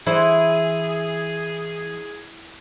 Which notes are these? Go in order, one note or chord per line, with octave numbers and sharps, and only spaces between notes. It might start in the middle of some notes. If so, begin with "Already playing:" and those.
E3 E4 G#4 C5